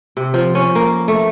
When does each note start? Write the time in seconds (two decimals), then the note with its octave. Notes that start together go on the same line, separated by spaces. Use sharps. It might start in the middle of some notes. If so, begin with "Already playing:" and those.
0.17 C3
0.34 F3
0.55 C#4
0.75 A#3
1.08 A3